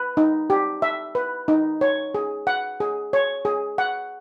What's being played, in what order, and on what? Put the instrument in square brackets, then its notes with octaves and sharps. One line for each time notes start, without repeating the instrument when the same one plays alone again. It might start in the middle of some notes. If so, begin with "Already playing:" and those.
Already playing: [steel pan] B4
D#4
G4
E5
B4
D#4
C#5
G#4
F#5
G#4
C#5
G#4
F#5